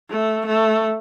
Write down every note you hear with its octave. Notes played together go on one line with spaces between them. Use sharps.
A3
A3